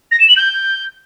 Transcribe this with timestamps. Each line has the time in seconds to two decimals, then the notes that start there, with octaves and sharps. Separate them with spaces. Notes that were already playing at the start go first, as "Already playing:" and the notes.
0.11 A#6
0.19 E7
0.28 F#7
0.36 G6